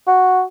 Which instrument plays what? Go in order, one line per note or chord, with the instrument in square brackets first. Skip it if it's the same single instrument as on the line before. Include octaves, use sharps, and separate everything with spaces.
[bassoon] F#4